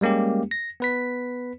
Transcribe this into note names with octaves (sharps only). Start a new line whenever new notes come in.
G3 G#3 A#3 C#4 G4
A#6
B3 B4 B6